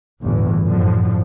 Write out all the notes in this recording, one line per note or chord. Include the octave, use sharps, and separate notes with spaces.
G1 E2 A2 E3
F#2 A2 D3 F3